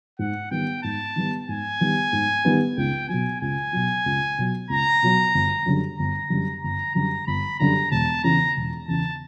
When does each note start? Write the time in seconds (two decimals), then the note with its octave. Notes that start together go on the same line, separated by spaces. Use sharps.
0.19 G#2 F#5
0.51 D#3 G3 B3 G5
0.83 G#2 A5
1.16 D#3 G3 B3
1.48 G#2 G#5
1.80 D#3 G3 B3
2.13 G#2
2.45 D#3 G3 B3
2.77 C#2 G5
3.09 B2 F#3 G#5
3.40 C#2 G#5
3.73 B2 F#3
4.06 C#2
4.38 B2 F#3
4.69 C#2 A#5
5.02 B2 F#3
5.34 G1
5.66 F#2 D3 G3
5.98 G1 A#5
6.30 F#2 D3 G3
6.63 G1 A#5
6.95 F#2 D3 G3 A#5
7.27 G1 B5
7.59 F#2 D3 G3 A#5
7.91 E1 A5
8.23 E2 C#3 A#5
8.56 E1
8.88 E2 C#3 A5